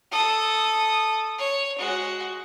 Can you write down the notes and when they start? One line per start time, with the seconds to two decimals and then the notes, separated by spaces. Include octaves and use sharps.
0.11 A4 D#6
1.38 C#5
1.78 G#3 F#4